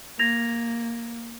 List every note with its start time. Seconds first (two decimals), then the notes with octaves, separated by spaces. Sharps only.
0.19 A#3 G#6 A#6 F7